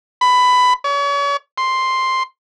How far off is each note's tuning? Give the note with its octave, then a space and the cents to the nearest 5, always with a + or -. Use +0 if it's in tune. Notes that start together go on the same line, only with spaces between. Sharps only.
B5 +15
C#5 +40
C6 +5